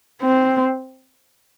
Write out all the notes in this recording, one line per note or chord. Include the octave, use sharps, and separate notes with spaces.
C4